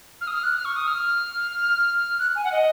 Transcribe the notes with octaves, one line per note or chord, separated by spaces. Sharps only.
F6
D#6
F6
F#6
F6
C#6
D#6
F6
F#6
G#5
F#5
D#5